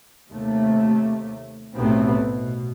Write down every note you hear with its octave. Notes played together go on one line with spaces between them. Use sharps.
D#2 C3 A3
B1 A2 C3 A3 B3 C4
B2